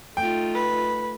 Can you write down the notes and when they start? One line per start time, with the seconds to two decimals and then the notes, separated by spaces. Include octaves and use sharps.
0.17 A3 D#4 F4 G5
0.54 B4